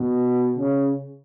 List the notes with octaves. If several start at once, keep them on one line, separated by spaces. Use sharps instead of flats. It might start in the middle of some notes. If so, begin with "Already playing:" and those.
Already playing: B2
C#3